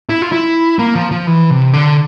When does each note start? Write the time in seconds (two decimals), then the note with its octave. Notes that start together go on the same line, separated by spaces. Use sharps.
0.09 E4
0.22 F4
0.32 E4
0.79 A#3
0.95 F3
1.11 F3
1.27 E3
1.50 C3
1.73 D3